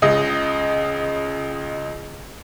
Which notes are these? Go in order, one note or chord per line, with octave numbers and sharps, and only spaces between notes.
C#2 C#3 D#5